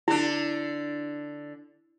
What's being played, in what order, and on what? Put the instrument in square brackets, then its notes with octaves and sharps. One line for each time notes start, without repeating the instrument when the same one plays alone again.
[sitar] D3 D4 [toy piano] E4